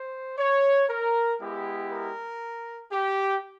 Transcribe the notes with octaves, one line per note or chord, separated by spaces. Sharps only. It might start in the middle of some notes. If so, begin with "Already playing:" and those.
Already playing: C5
C#5
A#4
G#3 B3 E4 G4
A#4
G4